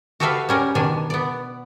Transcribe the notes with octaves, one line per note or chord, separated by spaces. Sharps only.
F#4 G4 A4 B4 E5 F5
G3 C#4 A#4
B2 D#3 D4 G#5
B3 D5